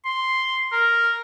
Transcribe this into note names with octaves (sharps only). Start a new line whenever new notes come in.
C6
A#4